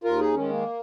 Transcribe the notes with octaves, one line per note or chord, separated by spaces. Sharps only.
D#2 F4 A#4
D#4 G#4
D#3 G#3 C#4
A#3